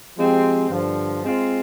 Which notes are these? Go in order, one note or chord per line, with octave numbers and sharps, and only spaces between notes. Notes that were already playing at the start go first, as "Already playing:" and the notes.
F3 G#3 C4 G4
G2 D3 F3
G#3 C4 F4